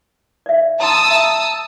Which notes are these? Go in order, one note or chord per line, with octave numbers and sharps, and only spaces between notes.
D5 E5
A5 A#5 C6 D#6 E6
E5 A#5